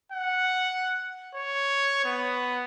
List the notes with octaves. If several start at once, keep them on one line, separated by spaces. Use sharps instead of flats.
F#5
C#5
B3